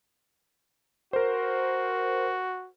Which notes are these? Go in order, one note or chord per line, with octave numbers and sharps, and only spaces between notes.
F#4 A#4 C5